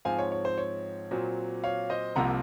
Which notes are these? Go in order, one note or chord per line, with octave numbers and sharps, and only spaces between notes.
G#2 F3 C4 F5 G#5
C#5
C#5
C5
C#5
A#2 F#3 C4
C#5 F5
C5 D#5
C2 C3 F3 A#3 F#5 A#5